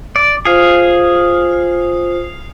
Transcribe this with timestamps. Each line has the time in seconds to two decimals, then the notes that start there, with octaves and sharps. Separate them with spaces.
0.16 D5
0.45 F4 G#4 C5 F5